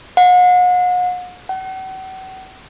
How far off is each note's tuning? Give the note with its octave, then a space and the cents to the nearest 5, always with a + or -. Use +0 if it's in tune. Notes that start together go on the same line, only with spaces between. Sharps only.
F#5 -40
F#5 +40